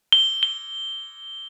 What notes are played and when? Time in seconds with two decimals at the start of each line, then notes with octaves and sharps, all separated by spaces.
0.12 G7
0.43 G7